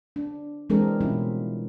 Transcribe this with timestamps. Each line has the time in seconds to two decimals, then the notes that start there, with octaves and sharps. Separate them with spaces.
0.16 D4
0.70 E3 G#3 C4 D4 G#4 A#4
1.01 B2 E3 G3 C#4 E4 F4